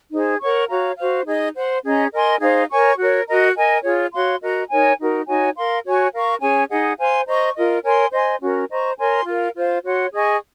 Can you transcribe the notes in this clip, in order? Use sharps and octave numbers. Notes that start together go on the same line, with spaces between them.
D#4 G#4 C5
A#4 C#5 F#5 C#6
F#4 C#5 F5 A#5
F#4 C5 F5
D#4 G#4 D#5
C5 F#5 C6
C#4 G#4 D#5 A#5
A#4 D#5 G#5 C6
D#4 G#4 C5 F5
A#4 C#5 G#5 C#6
F#4 A#4 C#5
F#4 A#4 D#5 A#5
A#4 D#5 G#5
F4 G#4 C#5
F#4 C#5 F5 C6
F#4 A#4 D#5 A#5
D#4 A#4 C#5 G#5
D#4 F#4 A#4
D#4 F#4 C#5 G#5
A#4 F5 C6
F#4 C#5 G#5 C#6
A#4 F5 A#5 C#6
C#4 G#4 C#5 G#5
D#4 G#4 D#5 F#5
C5 F5 G#5 C6
C5 D#5 A#5 C#6
F4 A#4 D#5
A#4 C#5 G#5 C6
C5 D#5 G#5 C6
C#4 F#4 A#4
C5 D#5 A#5 C#6
A#4 C#5 G#5 C6
F4 A#4 F5
F4 C5 F5
F#4 C#5 F#5 C6
G#4 D#5 G#5 C#6